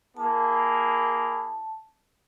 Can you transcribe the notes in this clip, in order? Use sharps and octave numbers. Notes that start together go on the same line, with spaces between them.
A#3 E4 G#4 A5